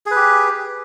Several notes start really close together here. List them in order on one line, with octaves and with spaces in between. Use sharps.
G#4 B4 G4